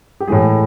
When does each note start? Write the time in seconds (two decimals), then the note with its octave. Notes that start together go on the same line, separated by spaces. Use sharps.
0.20 G4
0.28 A2 E3 G#3 G#4